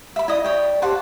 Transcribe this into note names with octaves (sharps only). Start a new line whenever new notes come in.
E5 B5
E4 D5 D#5 D#6
C#5 G5
G4 C5 F#5 A5